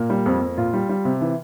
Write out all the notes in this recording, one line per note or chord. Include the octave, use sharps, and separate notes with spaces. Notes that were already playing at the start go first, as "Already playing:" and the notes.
Already playing: A#2 A#3
G3
F2
F2
A#2 F4
G3
G3
C3
E3